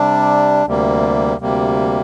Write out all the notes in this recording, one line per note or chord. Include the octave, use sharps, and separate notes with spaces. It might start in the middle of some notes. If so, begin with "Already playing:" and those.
Already playing: C3 G3 D4
D2 C3 G3 A#3
D2 C3 G3 A#3